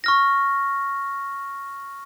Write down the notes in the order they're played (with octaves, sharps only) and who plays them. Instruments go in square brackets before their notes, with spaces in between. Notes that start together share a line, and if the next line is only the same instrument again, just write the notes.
[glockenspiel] C#6 F6 A#6